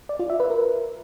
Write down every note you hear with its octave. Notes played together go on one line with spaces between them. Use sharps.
D5
F4
E5
B4
A#4